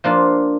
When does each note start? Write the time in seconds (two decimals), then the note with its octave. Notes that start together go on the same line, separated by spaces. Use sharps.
0.04 F3 A#3 D4 F4